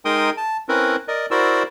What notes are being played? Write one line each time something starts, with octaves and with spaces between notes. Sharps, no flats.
G#3 D#4 A#4 G5 C6 D#6
A5
C4 C#4 E4 A#4 B4
A#4 D5 D#5
E4 F#4 A#4 C5 D5 E6